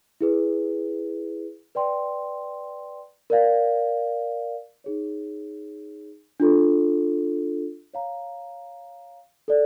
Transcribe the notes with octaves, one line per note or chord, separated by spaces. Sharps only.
E4 G#4 B4
B4 D5 G5 C6
A#4 D5 F5
D#4 G#4 C#5
D4 F4 A4
C#5 F5 A#5
A4 D5